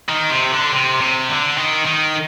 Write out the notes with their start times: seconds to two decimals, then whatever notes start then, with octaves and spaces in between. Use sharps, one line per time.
0.09 D#3
0.30 C3
0.51 D3
0.72 C3
1.01 C3
1.29 D3
1.58 D#3
1.86 D#3